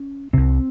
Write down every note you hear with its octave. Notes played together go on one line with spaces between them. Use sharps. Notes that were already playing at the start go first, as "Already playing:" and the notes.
Already playing: C#4
C2 C3 C4